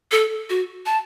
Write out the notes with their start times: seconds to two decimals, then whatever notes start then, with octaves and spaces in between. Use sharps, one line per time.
0.11 A4
0.50 F#4
0.86 A5